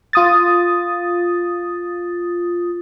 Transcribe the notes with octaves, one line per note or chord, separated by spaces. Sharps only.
F4 D#6 A6